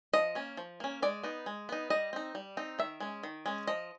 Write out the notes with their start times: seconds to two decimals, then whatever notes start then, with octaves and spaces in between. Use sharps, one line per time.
0.13 F3 D#5
0.35 A#3 C#4
0.57 F3
0.80 A#3 C#4
1.02 G#3 D5
1.23 B3 D#4
1.46 G#3
1.69 B3 D#4
1.90 G3 D#5
2.13 C4 D#4
2.35 G3
2.57 C4 D#4
2.79 D#3 E5
3.00 G#3 C#4
3.23 D#3
3.46 G#3 C#4
3.67 F3 D#5